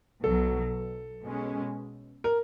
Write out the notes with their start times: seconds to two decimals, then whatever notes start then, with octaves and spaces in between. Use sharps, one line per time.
0.24 B1 B2 F#3 A4
1.24 B2 G#3 C#4
2.24 A#4